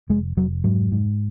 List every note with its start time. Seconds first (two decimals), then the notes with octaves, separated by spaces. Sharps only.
0.09 F1 G#3
0.37 F1 F#3
0.64 G#2 F#3
0.92 G#2